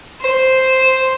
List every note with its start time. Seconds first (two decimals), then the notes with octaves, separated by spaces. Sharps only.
0.22 C5